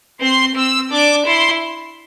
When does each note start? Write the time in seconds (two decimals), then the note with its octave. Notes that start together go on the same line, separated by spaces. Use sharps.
0.20 C4 C6
0.55 C4 E6
0.91 D4 D6
1.25 E4 C6